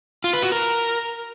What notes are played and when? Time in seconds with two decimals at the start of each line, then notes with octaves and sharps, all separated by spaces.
0.24 F4
0.33 B4
0.43 F#4
0.52 A#4